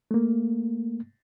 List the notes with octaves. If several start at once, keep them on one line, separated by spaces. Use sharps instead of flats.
A3 A#3